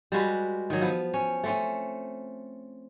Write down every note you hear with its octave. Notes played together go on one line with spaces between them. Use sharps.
G3 G#3 F#4 B4
D#3 F#3
F3 B3
C#4
A3 C4 C#4